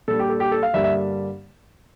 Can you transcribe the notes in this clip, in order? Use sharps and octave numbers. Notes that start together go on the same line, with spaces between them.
A#2 G3 D4 A4
G4
A4
G4
A4
F5
G2 D3 G3 A#3 D4 E5
E5